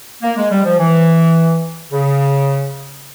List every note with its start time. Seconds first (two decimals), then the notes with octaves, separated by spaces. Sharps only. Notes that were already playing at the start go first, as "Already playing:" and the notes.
0.23 A#3
0.37 G#3
0.51 G3
0.65 F3
0.79 E3
1.92 C#3